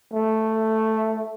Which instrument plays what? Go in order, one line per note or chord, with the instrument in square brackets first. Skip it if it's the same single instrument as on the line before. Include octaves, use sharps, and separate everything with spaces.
[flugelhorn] A3